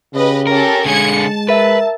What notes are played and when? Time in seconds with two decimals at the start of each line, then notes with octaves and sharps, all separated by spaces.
0.14 C#3 G4 B4 D#5
0.47 C#4 G4 A4 A#4
0.86 D3 G#3 G#4 G#6 C#7
1.19 A5
1.49 A#4 B4 E5